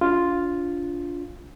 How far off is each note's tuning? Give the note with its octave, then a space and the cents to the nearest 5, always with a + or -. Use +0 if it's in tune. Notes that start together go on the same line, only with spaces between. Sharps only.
D4 -25 F4 +0